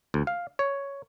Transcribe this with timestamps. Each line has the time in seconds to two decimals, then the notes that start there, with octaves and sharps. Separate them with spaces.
0.14 D2
0.27 F5
0.59 C#5